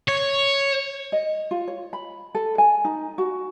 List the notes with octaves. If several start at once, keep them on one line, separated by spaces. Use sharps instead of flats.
C#5
D#5
F4
C#5
B5
A4
G#5
D#4
F#4